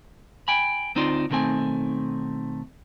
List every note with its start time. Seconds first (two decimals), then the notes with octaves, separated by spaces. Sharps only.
0.48 G5 G#5 B5
0.95 D2 C4 D#4 F4 D5 C6
1.30 B1 C3 D#3 A3 C4 G#5